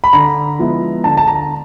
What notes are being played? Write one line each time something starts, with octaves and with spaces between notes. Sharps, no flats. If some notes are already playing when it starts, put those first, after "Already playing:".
B5
D3 A#5
F3 G#3 B3 E4
D3 A5
A5
A#5